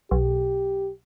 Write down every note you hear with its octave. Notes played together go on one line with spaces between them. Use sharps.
B1 G4